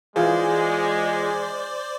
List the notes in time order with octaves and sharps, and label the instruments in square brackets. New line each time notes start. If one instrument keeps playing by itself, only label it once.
[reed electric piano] E3 F4 G#4 [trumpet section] G#3 [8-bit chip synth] C5 D5